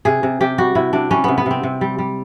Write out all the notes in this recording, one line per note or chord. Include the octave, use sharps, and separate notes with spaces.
C3 G#4
C3
C3 G4
G3 F#4
C3 E4
C3 D4
G3 C#4
C3 B3
B3
C3 C4
C3
G3
G3